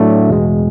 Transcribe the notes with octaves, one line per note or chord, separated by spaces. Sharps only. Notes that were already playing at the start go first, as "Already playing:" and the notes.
Already playing: A2 F#3 A3 D4
E2 B2 G#3